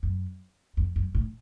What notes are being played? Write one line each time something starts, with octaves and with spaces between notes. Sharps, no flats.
F#2
F2
F#2
A2